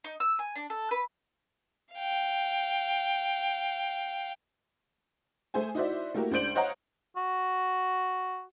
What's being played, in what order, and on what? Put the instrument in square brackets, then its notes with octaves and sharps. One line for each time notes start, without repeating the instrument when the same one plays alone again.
[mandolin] D#4
E6
G#5
D4
A4
B4
[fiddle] F5 G5
[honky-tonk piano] A3 G#4 C5 G#5
D#4 E4 F#4 C5 D5 E5
A3 A#3 E4 F#4 G4 A#4
C#2 D4 C5 G6 D7 F#7
C5 C#5 D#5 F5 F#5 A#5
[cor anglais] F#4